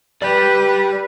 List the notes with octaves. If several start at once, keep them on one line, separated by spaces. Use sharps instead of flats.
G4 B4 D5